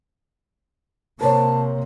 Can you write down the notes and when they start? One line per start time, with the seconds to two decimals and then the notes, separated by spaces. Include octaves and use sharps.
1.21 C3 A#3 A#4 C5 C#5 A5